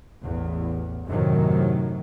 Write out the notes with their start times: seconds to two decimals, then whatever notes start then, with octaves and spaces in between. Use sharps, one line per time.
0.23 A1 E2
1.07 F#2 A2 C3 D#3 F#3